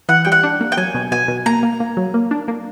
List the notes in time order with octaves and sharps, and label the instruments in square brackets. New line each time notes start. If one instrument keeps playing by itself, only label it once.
[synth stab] E3 [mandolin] F#5
[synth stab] G3 [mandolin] G5
[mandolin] F#5
[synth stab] D4
A#3
[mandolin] G5
[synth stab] F#3 [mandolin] G#5
[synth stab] B2
[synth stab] B2 [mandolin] G#5
[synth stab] B2
[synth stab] A#3 [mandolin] A#5
[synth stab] A#3
A#3
F#3
A#3
D4
A#3